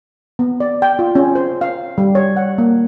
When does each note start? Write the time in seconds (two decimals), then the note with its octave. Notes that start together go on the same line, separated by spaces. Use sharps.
0.39 B3
0.60 D5
0.82 G5
0.99 F4
1.15 C#4
1.35 C5
1.61 F5
1.98 G3
2.15 C#5
2.37 F#5
2.58 A#3